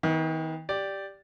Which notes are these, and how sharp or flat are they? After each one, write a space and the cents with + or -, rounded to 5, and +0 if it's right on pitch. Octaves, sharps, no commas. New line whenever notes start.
D#3 +40 B3 +15
G4 +0 D5 -5